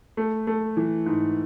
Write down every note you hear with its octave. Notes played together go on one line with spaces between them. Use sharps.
A3
A3
E3
G#2